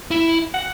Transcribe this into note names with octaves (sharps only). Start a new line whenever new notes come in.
E4
F#5